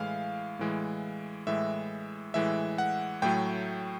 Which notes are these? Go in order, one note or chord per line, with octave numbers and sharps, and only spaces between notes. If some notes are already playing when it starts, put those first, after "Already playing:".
Already playing: A2 E3 G#3 F5
A2 E3 G#3
A2 E3 G#3 E5
A2 E3 G#3 E5
F#5
A2 F#3 A3 G5